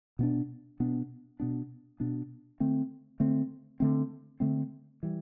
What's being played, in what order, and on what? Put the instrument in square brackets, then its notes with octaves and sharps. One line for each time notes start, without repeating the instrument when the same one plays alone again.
[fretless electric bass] B2 B3 D4
B2 B3 D4
B2 B3 D4
B2 B3 D4
D3 A3 C4
D3 A3 C4
D3 A3 C4
D3 A3 C4
E3 G3